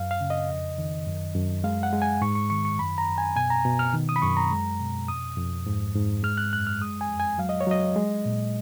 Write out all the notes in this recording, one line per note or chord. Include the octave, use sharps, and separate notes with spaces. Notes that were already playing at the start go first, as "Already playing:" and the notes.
Already playing: F#2 F5
F5
C#3
D#5
F2
D#3
F#2
F#2
G#3 F5
F#5
G#3
G#5
G#2 C#6
C#6
D#3 C#6
C#6
F#2 B5
A#5
F#2
G#5
B2 G#5
A#5
B2
F6
D#3
D#6
B5
F#2 C#6
A#5
G#3
B2
F2 D#6
F2
G#2
G#2
G#3 F6
F#6
F#2 F#6
F6
G#3 D#6
G#5
F2
G#5
F#3 F5
D#5
C#5
F#3 D#5
G#3
A#2